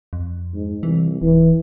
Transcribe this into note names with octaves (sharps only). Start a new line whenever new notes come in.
F2
G#2
C2 E3
D1 E3